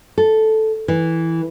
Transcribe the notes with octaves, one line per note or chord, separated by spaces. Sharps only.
A4
E3